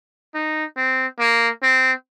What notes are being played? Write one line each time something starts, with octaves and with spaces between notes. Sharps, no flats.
D#4
C4
A#3
C4